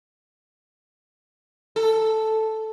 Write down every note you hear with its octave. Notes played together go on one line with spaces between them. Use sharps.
A4